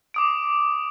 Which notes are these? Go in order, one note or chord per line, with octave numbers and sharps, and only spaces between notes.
D6 D#6 D7